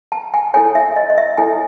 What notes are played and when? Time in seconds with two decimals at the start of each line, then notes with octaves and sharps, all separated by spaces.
0.12 A5
0.34 G#5
0.54 E4 A4 C#5 G#5
0.75 E5
0.96 D#5
1.10 D#5
1.18 E5
1.37 E4 A4 C#5 G#5